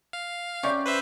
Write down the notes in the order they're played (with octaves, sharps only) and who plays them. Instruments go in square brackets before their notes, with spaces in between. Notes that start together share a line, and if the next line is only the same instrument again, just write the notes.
[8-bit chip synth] F5
[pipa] C3 G4 C#6 [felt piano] C#4 D5 G6
[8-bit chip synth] B4 C5 E5